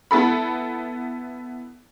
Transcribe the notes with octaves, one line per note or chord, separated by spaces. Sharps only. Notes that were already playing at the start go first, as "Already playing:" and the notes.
B3 E4 A4 B5